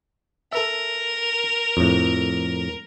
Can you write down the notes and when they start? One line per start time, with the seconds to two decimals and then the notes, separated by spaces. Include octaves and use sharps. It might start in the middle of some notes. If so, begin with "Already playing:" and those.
0.53 A4 A#4 E5
1.77 F2 A2